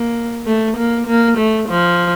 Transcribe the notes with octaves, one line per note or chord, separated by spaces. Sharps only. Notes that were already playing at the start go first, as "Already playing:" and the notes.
Already playing: A#3
A3
A#3
A#3
A3
F3